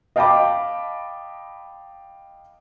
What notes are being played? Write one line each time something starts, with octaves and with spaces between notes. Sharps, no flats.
D#5 F5 G5 A5 B5 D6